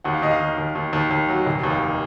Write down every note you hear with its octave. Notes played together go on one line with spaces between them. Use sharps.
D#2 F#5
F5
D#2 D#5
F5
D#2
D#2
D#2
D#2
D#2
F#3
F1
D#2
F5